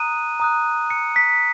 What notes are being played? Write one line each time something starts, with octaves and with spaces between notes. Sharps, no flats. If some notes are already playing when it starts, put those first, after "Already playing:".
Already playing: A#5 D#6 F#6 D#7
A#5 D#6 F#6
C#7
B6